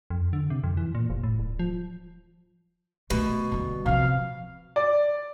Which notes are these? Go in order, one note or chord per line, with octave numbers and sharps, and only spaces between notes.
F2
D3
C3
F2
E3
A#2
F1
A2
D1
F3
B2 D#3 A3
D3 G3
C3 F3 F5
D5